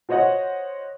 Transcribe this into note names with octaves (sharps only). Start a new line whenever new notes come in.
F#4 C5 C#5 D#5 F#5